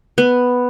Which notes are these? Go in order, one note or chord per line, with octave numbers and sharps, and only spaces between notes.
B3